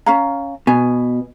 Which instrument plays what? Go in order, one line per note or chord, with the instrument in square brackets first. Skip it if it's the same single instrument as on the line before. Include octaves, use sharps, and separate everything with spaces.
[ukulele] C#4 F5 A#5
[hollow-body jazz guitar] B2 [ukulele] G#5